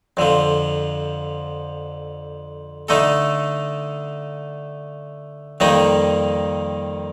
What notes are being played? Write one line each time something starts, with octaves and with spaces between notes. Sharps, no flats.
F2 D3 F3
D3 A3 D#4 A4
F2 D#3 G3 A#3 D#4